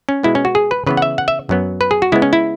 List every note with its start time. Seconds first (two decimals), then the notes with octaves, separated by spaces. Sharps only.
0.09 C#4
0.23 B2 G#3 B3 E4
0.35 C#4
0.45 F#4
0.55 G#4
0.71 B4
0.87 C#3 E3 B3 B4
0.97 F#5
1.02 E5
1.18 F#5
1.28 E5
1.49 F#2 F#3 B3
1.81 B4
1.91 G#4
2.02 F#4
2.12 C#3 G#3 B3 E4
2.22 C#4
2.33 E4